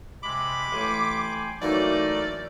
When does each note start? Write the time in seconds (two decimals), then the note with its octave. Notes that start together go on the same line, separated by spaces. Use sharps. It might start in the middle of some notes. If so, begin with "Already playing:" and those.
0.23 C3 G#3 B5 D6
0.72 A1 G5 G#5 C6
1.62 E3 F#3 A3 A#3 D#4 A4 A#4 D5